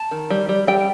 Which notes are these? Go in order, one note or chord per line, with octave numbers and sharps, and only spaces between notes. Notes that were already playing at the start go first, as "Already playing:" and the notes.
Already playing: A5
D#3
G3
G3
G3 G5